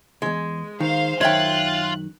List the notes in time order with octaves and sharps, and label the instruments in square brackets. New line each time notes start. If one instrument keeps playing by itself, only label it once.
[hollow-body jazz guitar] B1 E2 [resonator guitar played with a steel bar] G#3
[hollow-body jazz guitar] D#3 [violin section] C5 F5
[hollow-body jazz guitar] F#2 D#3 [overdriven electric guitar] F4 [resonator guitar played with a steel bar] C#5 E5 G5 [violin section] F#6